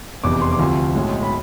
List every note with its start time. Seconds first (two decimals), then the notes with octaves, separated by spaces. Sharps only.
0.24 F1 E2 C3 D6
0.42 C6
0.52 D6
0.59 D2 C3 F3 C6
0.95 B1 A2 G#3
1.23 B5